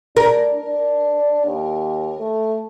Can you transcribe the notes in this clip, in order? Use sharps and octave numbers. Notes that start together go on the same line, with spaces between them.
D4 A#4
D4
D#2
A3